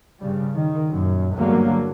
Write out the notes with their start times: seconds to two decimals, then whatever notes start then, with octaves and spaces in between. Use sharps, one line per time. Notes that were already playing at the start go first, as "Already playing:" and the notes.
0.21 G2 C#3 G3
0.56 D#3
0.91 F#2 A#2
1.35 E2 G2 D3 F#3 G3 A#3